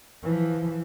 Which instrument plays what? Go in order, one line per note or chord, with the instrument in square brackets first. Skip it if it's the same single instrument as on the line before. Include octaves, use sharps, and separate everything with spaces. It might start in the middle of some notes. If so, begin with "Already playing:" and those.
[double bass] E3 F3